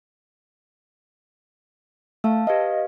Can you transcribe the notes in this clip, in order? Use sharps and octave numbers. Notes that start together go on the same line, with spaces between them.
A3 F5 A5 E6
G4 B4 D#5 F5